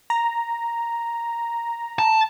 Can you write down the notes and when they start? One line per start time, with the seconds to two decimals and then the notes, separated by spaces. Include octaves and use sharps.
0.10 A#5
1.99 A5